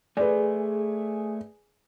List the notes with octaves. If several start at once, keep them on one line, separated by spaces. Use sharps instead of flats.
A3 G#4 B4 D5 G#5